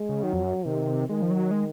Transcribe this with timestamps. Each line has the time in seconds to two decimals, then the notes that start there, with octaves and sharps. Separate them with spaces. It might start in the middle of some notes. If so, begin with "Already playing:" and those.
Already playing: G#3
0.09 C#3
0.23 D#3 F#3
0.33 F2
0.44 F#2
0.66 C3 D#3
1.09 D#3 G#3
1.22 F3
1.31 F#3
1.51 G#3